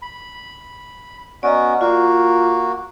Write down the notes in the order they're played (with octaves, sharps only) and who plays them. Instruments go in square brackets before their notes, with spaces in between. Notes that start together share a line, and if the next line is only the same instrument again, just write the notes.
[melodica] B5
[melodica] B3 C#4 F#4 [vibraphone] D5 D#5 A#5
[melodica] A#3 F#4 [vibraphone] F4